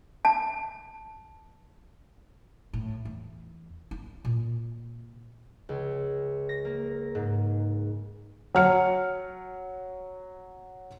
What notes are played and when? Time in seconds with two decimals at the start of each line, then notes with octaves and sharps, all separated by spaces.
0.25 A5
2.73 A2
3.05 E2
3.91 E4
4.25 A#2
5.69 C#2
6.49 A#6
6.65 A#3
7.15 G#2
8.55 F#3 F6 C#7